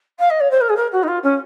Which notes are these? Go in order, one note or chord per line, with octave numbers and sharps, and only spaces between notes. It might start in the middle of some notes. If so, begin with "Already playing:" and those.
F5
D#5
C#5
C5
A#4
G#4
A#4
F#4
D#4
F4
C#4